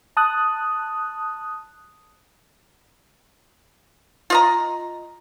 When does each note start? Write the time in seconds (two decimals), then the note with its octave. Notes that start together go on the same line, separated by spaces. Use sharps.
0.17 A5 D#6 F#6
4.30 F4 D#5 A#5